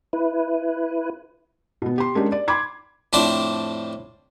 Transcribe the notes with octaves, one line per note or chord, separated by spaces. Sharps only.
E4 B4
B2 B3
G4 C6
G#3 A#3 C#4 D4 G4
D5
B5 C6 D6 G#6
F2 A2 D4 C5 D5 G5